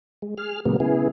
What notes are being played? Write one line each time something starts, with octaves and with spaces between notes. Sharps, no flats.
G#3
G#4 F6
A#2 C#3 F#3 G#3 A#3 B3
C#3 B3 E4 G#4